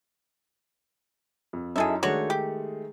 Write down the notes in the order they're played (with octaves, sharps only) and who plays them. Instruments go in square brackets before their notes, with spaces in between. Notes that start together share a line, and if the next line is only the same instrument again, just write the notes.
[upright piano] F2
[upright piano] F#2 D#4 E4 [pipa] G#4 A4 E5
[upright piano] D#3 G#3 A3 [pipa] D4 F#4 C#5
[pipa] G4